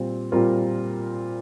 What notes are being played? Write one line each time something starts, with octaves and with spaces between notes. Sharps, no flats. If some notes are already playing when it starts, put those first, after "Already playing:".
Already playing: A#2 G3 C4 F4
A#2 G3 C4 F4 A#4